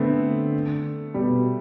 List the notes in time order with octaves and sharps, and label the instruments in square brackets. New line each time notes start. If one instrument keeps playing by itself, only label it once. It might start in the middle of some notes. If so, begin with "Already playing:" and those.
Already playing: [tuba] D3 [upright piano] A3 B3 C4
[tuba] B2 [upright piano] G3